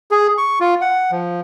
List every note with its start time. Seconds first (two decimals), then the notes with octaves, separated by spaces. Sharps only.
0.11 G#4
0.38 C#6
0.60 F4
0.81 F#5
1.11 F3